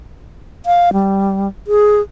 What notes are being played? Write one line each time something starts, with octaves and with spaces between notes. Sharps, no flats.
F5
G3
G#4